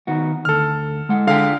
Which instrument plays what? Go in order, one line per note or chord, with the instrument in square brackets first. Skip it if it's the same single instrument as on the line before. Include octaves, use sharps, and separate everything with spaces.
[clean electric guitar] D#3 B3 F#4
[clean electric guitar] D2 [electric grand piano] A4 F6
[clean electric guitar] G#3 F#5
[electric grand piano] D3 F5 [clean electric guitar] F4 G#4 G5